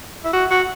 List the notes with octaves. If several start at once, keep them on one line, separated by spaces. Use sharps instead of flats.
E4
F#4
F#4